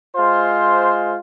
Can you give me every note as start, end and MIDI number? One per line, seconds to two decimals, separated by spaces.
0.16 1.15 56
0.16 1.15 65
0.16 1.15 72